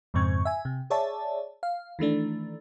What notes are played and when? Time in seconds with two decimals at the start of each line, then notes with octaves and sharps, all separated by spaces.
0.14 F2 G#2 C#3 C4 C#6 G#6
0.45 E5 G#5
0.65 C3
0.90 G#4 C#5 D5 E5 A5
1.63 F5
1.99 D#3 E3 A3 D4